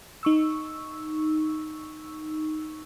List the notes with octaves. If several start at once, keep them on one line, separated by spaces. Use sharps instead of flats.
D#4 C#6 E6